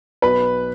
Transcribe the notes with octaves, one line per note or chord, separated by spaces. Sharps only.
B1 B4 B5